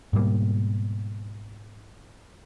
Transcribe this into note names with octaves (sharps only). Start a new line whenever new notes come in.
G#2 B2 G3 A#3